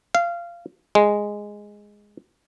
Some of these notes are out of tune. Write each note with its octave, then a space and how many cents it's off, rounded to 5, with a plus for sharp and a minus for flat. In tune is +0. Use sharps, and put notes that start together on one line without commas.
F5 -20
G#3 -5